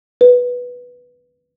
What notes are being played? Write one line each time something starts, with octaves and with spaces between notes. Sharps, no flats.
B4